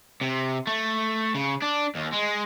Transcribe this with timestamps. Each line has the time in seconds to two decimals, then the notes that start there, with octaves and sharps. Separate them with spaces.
0.21 C3
0.67 A3
1.35 C#3
1.62 D4
1.95 D#2
2.13 G#3